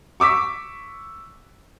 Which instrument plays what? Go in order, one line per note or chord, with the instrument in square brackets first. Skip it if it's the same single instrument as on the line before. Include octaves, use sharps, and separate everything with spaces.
[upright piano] C#6 D6 E6 B6